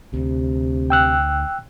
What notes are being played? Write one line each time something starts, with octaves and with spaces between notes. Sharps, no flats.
D2 C3
G5 E6 F#6